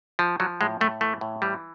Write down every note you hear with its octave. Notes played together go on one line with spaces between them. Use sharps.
F3
F3 F#3
A2 G#3
A2 A3
E3 A3
A2
E3 G3